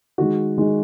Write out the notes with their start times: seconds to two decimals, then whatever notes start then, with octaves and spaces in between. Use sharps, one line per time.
0.18 D#3 G#3 F#4
0.57 D#3 G#3